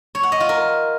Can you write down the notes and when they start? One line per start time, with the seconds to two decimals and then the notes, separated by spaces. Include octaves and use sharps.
0.15 C#5
0.23 F#5
0.32 D#5
0.40 F4
0.49 A#4